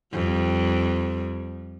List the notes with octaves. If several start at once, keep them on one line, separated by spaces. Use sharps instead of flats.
F2 G3